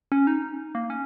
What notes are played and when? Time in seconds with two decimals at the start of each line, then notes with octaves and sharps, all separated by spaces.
0.12 C#4
0.27 D#4
0.75 A#3
0.90 C#4